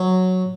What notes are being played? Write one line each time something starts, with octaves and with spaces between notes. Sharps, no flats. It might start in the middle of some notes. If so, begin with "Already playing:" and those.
Already playing: F#3